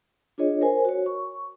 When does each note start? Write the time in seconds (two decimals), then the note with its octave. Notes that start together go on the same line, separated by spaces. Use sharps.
0.38 D4 F4 G#4 C#5 D#5
0.61 A#4 C5 G#5
0.85 F#4 C#5
1.06 C#6